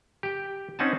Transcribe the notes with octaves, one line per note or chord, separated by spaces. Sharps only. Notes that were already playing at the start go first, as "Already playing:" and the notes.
G4 G5
C4 C#4 D#4 F#5 G#5 A5